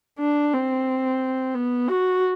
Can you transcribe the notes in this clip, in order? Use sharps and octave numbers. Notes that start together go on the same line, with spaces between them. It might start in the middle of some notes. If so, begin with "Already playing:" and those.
D4
C4
B3
F#4